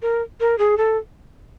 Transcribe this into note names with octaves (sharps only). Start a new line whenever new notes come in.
A#4
A#4
G#4
A4